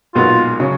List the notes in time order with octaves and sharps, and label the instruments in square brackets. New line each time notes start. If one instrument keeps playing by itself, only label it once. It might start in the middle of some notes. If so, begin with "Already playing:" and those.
[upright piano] B1 A#2 G#3 B3 F#4 [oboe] F4
[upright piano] C#3 F#3 C#4